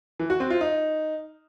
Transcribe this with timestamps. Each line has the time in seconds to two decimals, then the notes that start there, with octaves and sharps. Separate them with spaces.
0.19 E3
0.30 F#4
0.40 C4
0.50 F4
0.61 D#4